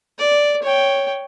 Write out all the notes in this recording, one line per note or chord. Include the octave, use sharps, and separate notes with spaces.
D5
C#5 G5